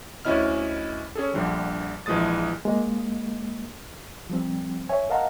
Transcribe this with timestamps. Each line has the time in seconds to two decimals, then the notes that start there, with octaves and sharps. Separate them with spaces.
0.25 D2 C#4 E4 D#5 F6
1.15 C#4 G#4 A4
1.34 A#1 D3 F3 G3
2.06 A#1 E3 F3 G#3 D#6 A6
2.65 G#3 A#3
4.30 F3 G3 C4
4.89 C#5 E5 G#5
5.10 A#4 D#5 F5 F#5 A5 A#5